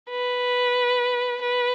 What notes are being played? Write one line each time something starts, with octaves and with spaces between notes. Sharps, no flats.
B4
B4